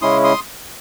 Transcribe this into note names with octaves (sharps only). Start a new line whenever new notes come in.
C#3 G#3 C#4 E4 C6 D#6
C6 D#6